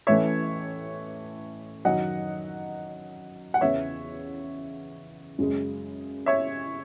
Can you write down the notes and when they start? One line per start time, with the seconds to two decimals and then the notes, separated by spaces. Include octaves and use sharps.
0.07 A1 A2 E3 A3 C#4 C#5 E5
1.84 F#2 D#3 F#3 D#5 F#5
3.54 F#5
3.61 E2 C#3 E3 B3 C#5 E5
5.38 F#2 C#3 G#3
6.26 C#5 E5